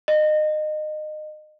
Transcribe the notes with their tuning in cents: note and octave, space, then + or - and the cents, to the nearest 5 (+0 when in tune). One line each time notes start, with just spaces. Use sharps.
D#5 -25